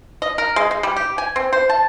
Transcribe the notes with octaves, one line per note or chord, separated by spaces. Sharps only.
D#5
A#4
G#3
G#3
G3
G4
G#5
C4
C5
A5